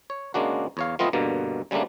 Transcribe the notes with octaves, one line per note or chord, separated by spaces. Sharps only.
C#5
C#3 G#3 A#3 D4 F#4
E2 C#5 F5
F3 A3 B3 C4 F4 D#5
G2 B2 D3 A#3
C#3 G3 A3 A#3 D4